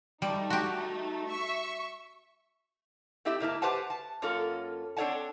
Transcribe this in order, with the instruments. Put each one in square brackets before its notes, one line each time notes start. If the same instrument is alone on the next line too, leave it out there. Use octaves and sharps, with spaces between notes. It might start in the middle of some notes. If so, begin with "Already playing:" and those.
[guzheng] G3 [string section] A3 D#4
[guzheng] F#4 G4
[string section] E5 C#6
[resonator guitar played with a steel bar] A3 C4 E4 G4 E5
G#2 A#3 E4 A5
G4 B4 C5 F#5 A5
A5
F#2 A#3 C#4 F4 A4
C4 D4 A4 C#5 F#5 A5